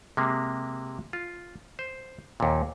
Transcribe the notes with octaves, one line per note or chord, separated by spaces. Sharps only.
C3 G#3 A#3
F4
C5
D#2 A#2